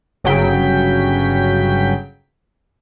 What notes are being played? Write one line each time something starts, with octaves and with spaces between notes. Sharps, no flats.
G1 C#3 F#3 G5 B6